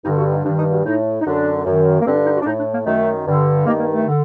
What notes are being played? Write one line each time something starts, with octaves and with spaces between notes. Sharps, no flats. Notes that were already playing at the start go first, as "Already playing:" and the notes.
G2 D3 D#4
F#4
D#4
G2 D#3 D4
D#4
F#4
A2 D#4
D#4
F#2 D3 D4
F#2 D#3
A#3
G2 D3 C4
D4
D#4
F#4
D4
A2 D#4
D4
A#3
F#2 D#3 A3
G2 D3
G2 D#3 A#3
A#3
A3
D3